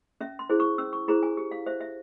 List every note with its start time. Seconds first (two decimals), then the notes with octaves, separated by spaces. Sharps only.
0.21 C#4 E5
0.39 C6
0.49 E4 G#4 C5
0.60 C#6
0.78 C#4 E6
0.93 C#6
1.08 E4 G#4 C5 A#5
1.23 G#5
1.37 G4
1.51 F5
1.66 C5 E5
1.81 E5